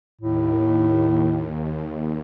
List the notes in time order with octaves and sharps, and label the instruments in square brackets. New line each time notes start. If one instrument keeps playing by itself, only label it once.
[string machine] D#2 [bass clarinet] A2